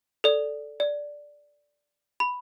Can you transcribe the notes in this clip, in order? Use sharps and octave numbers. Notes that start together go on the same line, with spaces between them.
A4 D5
D5
B5